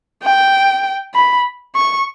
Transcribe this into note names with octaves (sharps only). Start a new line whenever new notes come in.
G5
B5
C#6